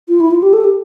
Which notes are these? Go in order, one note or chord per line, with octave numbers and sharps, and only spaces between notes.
F4
E4
F4
G4
A4
G4